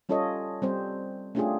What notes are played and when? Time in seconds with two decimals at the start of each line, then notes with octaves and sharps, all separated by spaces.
0.09 G3 C#4 F4 A4 C#5 D#5
0.62 G3 C4 C5
1.35 A3 C#4 D4 F4 G4 G#4